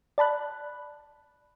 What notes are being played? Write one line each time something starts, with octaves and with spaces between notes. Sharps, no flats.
D5 A5 B5 F#6